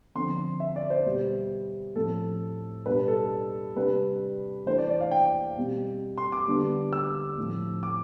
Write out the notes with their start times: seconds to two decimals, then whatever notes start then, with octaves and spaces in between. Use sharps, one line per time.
0.15 D3 F3 C4 C6
0.60 E5
0.76 D5
0.90 C5
1.06 B2 G3 B3
1.96 A2 F3 C4 A4
2.86 B2 G3 D4 B4
3.08 A4
3.76 C3 G3 D4 B4
4.66 E3 A3 D4 C5
4.78 D5
4.90 D5
5.01 F5
5.11 G5
5.57 B2 G3 C4
6.18 C6
6.32 D6
6.47 D3 G3 B3 D4
6.93 E6
7.37 A2 F3 C4
7.83 D6